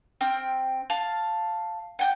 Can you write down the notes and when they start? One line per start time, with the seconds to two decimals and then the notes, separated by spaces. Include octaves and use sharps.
0.21 C4 G5 F6
0.90 F5 A5
1.99 F#5 G5 G6